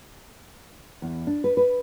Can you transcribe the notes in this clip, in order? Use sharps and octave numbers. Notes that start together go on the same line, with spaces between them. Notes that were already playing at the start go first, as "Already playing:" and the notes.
E2
D4
B4
B4